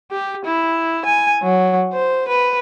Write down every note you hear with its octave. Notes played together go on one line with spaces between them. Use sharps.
G4
E4
G#5
F#3
C5
B4